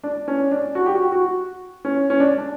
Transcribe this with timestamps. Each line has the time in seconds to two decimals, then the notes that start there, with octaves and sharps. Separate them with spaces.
0.03 D4
0.28 C#4
0.51 D4
0.75 F#4
0.86 G4
0.95 F#4
1.12 F#4
1.85 C#4
2.10 C#4
2.20 D4
2.38 D4